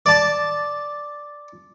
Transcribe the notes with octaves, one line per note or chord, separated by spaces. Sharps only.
D5 A5